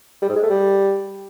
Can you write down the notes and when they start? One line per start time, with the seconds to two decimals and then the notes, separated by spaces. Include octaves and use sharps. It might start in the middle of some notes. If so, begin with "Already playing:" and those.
0.22 G3
0.29 G#2
0.36 G#3
0.43 A3
0.50 G3